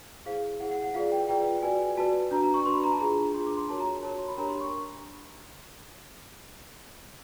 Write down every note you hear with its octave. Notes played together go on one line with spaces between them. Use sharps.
E4 G#4 C5 F5
E4 G#4 C5 F#5
F#5
F#5
F4 G#4 B4 D5 F5
G5
F4 G#4 B4 D5 G5
F#4 B4 D5 G#5
F#4 B4 D5 A5
D4 F#4 B4 A#5
A#5
C#6
D4 F#4 B4 C6
B5
A#5
A5
D4 F4 G#4 A#5
D4 F4 G#4 C6
D6
C6
F#4 A#4 C#5 A5
A#5
F#4 A#4 C#5 A5
C6
B5
D4 G4 A#4 C#5 A#5
C6
C#6